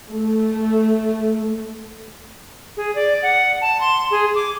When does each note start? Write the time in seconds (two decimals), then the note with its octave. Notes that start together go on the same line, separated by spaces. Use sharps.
0.11 A3
2.77 G#4
2.95 D5
3.22 F#5
3.62 A5
3.81 C6
4.11 G#4
4.35 D6